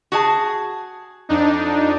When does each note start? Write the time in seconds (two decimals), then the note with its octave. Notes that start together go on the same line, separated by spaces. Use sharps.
0.12 F#4 G#4 A5
1.29 F2 D4 D#4